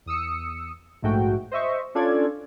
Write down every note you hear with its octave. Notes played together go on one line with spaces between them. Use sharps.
E2 D#6 E6 C#7
A#1 G#2 A3 F#4 G5
C5 D#5 E5 C#6
C#4 D4 F4 A4 D5 G#6